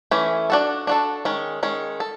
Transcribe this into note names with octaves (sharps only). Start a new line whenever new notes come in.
E3 A3 C#4
D4 F#4 A4
D4 F#4 A4
D#3 G#3 C#4
D#3 G#3 C#4
A4